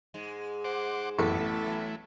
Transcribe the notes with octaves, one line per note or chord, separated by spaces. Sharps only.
G#2 G#3
C5 F#5 D6
A1 F#2 B3 E4 A4
A3 E4
A2 E3 F#3